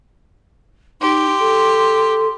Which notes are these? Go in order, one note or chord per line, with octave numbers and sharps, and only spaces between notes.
D#4 G4 C6
A4